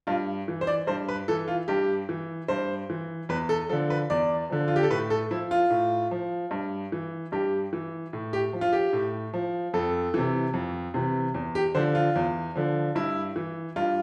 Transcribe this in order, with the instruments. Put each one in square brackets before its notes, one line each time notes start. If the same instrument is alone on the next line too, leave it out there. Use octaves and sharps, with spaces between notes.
[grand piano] G2 F4
E3
C5
D5
G2 C5
B4
E3 A4
F4
G2 G4
E3
G2 C5
E3
E2 B4
A4
F3 A4
D3
B4
E2 D5
D3 F3
F4
G4
A4
A2 B4
A4
F3 E4
F4
A2
F3
G2
E3
G2 G4
E3
A2
G4
F3
F4
G4
A2
F3
F2 A4
C3 E3
F2
C3 E3
E2
G4
D3 F3 C5
F4
E2
D3 F3
G2 E4
E3
G2 F4